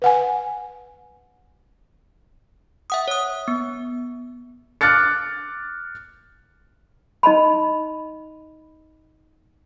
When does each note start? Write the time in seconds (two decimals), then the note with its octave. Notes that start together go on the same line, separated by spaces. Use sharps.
0.02 B4 F#5 G#5
2.90 E5 F#5 D#6
3.08 C#5 D#6
3.48 B3
4.81 D6 F6 F#6 A6 C#7
7.23 D#4 D#5 A5 B5